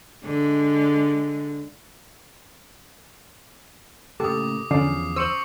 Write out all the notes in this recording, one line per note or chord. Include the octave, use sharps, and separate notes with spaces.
D3 G#3
A2 C#3 A#3 G4 A4 D6 D#6
E2 D3 F3 C#4 D5 C7
C5 C#6 E6 C#7 F#7